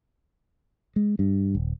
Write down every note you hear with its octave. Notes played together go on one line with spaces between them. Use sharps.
G#3
G2
D#1